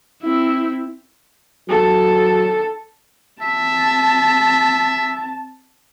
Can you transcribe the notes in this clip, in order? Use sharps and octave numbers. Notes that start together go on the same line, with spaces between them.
C4 E4
F#3 A4
C4 E5 A5